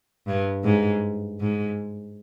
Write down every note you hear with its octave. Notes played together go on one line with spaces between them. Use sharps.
G2
G#2
G#2